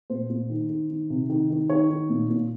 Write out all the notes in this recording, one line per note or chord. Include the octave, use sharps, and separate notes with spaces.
A#2 C5
A#2
D#3
D#3
D#3
C3
D#3
D#3
D#3 C#5
D#3
A#2
A#2